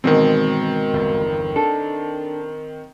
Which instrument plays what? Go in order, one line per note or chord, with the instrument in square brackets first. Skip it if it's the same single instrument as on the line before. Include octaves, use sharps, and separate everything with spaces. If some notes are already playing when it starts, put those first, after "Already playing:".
[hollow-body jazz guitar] G#2 B2 [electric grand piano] D#3 C4 [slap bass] E3
[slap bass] G1 E2
[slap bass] D4 [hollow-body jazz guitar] A4